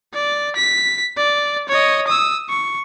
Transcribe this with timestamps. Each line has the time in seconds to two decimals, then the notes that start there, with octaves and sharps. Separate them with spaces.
0.14 D5
0.56 B6
1.17 D5
1.69 C#5 D#5
2.07 D#6 E6
2.49 C#6